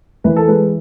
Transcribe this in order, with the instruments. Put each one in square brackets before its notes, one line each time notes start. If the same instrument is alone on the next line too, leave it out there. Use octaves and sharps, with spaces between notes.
[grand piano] E3 [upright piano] B4
[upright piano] A4
[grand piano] G#3 [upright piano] B4